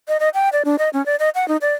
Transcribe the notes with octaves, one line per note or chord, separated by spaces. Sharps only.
D#5
D#5
G5
D5
D4
D#5
C#4
D5
D#5
F#5
D#4
D5